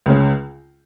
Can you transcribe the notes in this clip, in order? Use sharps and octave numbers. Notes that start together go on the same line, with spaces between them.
C#2 C#3 G#3 C#4